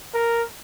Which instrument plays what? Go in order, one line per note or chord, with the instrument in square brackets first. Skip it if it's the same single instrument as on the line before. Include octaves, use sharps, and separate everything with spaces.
[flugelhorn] A#4